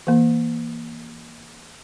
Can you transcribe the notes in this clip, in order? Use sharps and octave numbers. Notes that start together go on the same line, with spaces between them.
E3 A#3